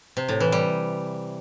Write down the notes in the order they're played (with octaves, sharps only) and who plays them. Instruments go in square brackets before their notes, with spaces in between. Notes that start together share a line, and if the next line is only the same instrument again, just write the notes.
[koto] C3
A2
E3
G3